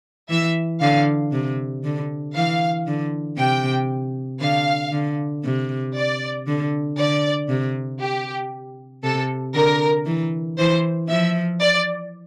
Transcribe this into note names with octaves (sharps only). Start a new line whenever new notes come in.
E3 E5
D3 F5
C3
D3
E3 F5
D3
C3 G5
D3 F5
D3
C3
D5
D3
D3 D5
C3
G4
C3 A4
D3 A#4
E3
E3 C5
F3 E5
D5